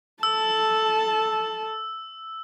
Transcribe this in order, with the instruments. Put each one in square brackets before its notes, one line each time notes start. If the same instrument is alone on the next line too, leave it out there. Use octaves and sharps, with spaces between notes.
[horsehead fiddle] A4 A5 [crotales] E6